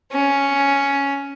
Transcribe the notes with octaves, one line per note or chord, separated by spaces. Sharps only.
C#4